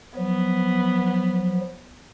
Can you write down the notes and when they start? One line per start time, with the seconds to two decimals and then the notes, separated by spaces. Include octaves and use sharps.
0.17 F3 F#3 B3